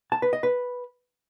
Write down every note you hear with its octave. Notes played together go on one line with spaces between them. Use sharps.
A5
B4
D#5
B4